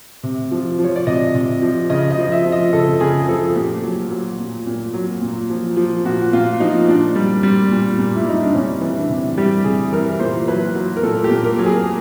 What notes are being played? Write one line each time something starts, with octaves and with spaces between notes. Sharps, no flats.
C3
F3
F3
C#5
D5
C3 D#5
C3
F3
C#3 D#5
D#5
F3
E5
F3
D#5
C#3 A4
C#3 G#4
F3 A4
A#2 G4
F#3
F#3
A#2
A#2
F#3
A#2
F3
F3
A#2 F#4
A#2 F4
F3 D#4
A#2 D4
G3
G3
A#2
A#2
E4
G3 D#4
D4
C3 C#4
E3
D4
C3
G3 G4
C3 G#4
E3 A#4
A#2 C5
F#3 B4
F#3
A#4
A#2 A4
G4
A#2
A#4
F#3
G#4